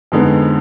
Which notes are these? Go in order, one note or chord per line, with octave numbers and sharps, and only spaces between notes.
F2 D3 G#3 B3 D#4